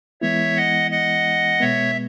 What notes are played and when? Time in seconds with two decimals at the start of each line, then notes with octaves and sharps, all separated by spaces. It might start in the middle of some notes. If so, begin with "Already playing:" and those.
0.21 E3 G#3 B3 E4 C#5 E5
0.56 D#5 F#5
0.91 D#5 F#5
1.60 B2 G#3 B3 C#5 E5